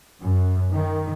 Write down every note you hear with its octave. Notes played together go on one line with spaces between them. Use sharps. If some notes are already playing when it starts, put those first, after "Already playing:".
F#2
D#3